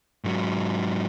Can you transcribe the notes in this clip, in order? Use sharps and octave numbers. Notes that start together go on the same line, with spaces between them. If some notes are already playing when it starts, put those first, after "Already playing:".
G#2 F#3